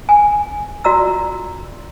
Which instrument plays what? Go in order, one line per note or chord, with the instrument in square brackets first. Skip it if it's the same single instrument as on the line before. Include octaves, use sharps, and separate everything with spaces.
[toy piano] G#5
F4 F#4 D5 A#5 E6